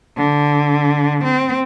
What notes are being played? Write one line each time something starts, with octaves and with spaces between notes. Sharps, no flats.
D3
C4